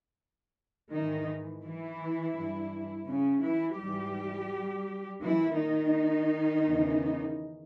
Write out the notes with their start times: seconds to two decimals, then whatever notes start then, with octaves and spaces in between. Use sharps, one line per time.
0.92 G#2 D#3 E3 D#4
1.63 E3 E4
2.36 G2 E3
3.07 C#3 C#4
3.42 E3 E4
3.78 G#2 E3 G3 G4
5.21 A#2 E3 E4
5.57 D#3 D#4
6.64 E2 C#3 E3